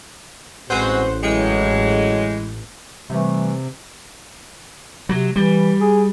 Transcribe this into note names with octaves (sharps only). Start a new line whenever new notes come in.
A1 G#3 B3 C4 F#4 C5 F#5 G6
E3 F#3 G#3 G5 C#7
C3 E3 G3 A3
C3 F#3
E3 G3
G#4